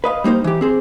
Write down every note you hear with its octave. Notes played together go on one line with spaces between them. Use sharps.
B4 D#5 F5
G3 A#3 D#4 C5
E3 G4
C4 G#4 C5